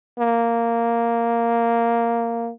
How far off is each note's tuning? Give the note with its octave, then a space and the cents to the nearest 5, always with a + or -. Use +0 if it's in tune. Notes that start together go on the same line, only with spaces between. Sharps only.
A#3 -5